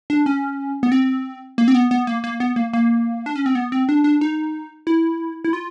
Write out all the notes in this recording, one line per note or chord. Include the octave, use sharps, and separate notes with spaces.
D4
C#4
B3
C4
A#3
C4
B3
B3
A#3
A#3
B3
A#3
A#3
D4
C#4
C4
B3
C4
D4
D4
D#4
E4
E4
F4